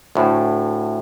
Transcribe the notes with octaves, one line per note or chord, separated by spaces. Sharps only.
D2 A2